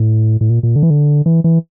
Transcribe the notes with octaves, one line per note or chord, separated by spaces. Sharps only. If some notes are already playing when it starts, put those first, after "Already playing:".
Already playing: A2
A2
A#2
A#2
D3
E3
D3
E3
E3